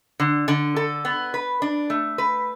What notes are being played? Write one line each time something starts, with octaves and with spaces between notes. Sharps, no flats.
D3
D3
A4
B3
B4
D4
A3
B4